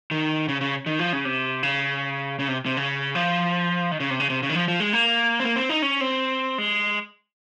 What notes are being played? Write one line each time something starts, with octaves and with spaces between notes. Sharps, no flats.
D#3
C#3
C#3
D#3
F3
C#3
C3
C#3
C#3
C3
C3
C#3
F3
D#3
C#3
C3
C#3
C3
C#3
D#3
F3
F3
G#3
A#3
C4
A#3
C4
D#4
C#4
C4
G#3